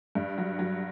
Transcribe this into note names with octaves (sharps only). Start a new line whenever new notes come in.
G2
F#3
F#3